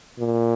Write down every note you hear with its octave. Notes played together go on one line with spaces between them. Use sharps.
A#2